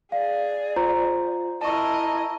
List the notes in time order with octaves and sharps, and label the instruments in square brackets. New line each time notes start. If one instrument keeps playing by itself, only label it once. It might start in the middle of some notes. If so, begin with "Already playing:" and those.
[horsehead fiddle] G#4 [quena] D5 [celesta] F5
[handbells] F4 C5 [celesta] A#5
[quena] E4 [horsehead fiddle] A#4 D#5 [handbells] A5 C#6